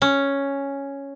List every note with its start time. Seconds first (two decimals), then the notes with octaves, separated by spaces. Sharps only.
0.02 C#4